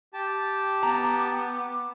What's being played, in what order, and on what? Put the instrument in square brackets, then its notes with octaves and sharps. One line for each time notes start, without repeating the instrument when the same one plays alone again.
[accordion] G4 A5
[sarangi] B3 [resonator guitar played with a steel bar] A#5 [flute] D6